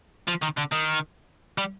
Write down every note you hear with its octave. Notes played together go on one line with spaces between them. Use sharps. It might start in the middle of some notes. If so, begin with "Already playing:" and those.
F3
D#3
D3
D#3
G3